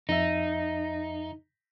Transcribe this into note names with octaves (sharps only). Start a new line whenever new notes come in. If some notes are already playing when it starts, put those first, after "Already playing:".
F2 D#4 E5